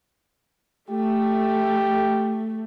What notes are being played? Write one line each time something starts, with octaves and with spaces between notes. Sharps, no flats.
A3 G4